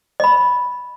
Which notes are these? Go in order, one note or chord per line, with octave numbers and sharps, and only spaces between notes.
D#5 B5